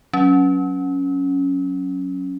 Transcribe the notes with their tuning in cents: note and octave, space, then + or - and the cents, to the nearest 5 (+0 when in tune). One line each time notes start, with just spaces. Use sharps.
F#3 +0 C#4 +0